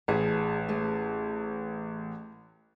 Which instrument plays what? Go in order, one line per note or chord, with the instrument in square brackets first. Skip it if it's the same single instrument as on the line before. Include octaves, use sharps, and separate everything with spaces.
[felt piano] A1 [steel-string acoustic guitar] G#4 B4 A5
[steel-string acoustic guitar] A3 G#4 A5